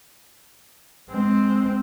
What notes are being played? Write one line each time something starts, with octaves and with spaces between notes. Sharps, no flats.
G#3 C4